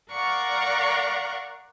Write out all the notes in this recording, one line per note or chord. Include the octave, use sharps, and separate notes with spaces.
A#4 D5 F5 F#5 A#5 C#6